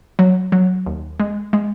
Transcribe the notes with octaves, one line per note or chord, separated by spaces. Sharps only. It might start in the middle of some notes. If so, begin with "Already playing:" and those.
F#3
F#3
D#2
G#3
G#3